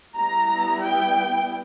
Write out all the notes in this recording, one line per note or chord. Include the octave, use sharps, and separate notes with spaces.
G3 B3 E4 A#5
G5